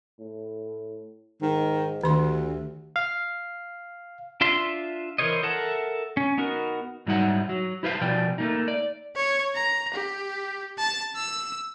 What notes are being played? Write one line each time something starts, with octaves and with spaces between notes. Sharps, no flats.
A2
G#2 D#3
D2 D#3 G4 C6
F5
D4 F4 E5 C6
E3 A#4 C5 C#5 D#5
A4 A#4 E5 F#5 A5
C#4
B3 D#4 F#4 A#4
G#2 F#3 G3 D#4 E4 F#5
F#3
E4 G4 B4 C5 D#5 F5
B2 F3 D5 G5
A3 A#3 D#4
D5
C#5
A#5
G4
A5
E6